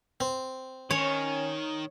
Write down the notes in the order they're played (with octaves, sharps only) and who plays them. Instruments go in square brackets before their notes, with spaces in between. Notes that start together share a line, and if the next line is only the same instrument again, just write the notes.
[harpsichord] C4
[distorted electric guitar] D#3 [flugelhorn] C#4 [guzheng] C#5